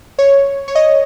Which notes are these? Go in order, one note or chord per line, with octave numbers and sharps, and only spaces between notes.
C#5
C#5
D#5